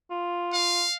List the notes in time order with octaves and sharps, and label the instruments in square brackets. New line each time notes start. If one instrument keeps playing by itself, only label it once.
[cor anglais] F4
[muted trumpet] F5